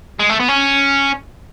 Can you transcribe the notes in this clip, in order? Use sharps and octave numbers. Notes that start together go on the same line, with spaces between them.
G#3
A3
B3
C#4